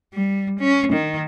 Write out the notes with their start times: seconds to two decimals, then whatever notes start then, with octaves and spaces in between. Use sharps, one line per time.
0.13 G3
0.59 C#4
0.93 D#3